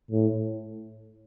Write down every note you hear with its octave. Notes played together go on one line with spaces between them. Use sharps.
A2